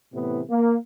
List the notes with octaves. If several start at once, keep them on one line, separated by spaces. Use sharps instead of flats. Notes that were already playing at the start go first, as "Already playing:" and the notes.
A2 C3 E3 B3
A#3